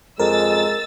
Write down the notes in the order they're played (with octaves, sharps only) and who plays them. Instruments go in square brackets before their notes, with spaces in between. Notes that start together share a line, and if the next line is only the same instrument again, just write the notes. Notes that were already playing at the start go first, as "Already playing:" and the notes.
[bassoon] F2 [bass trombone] G#3 [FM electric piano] A#4 [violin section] E6 A6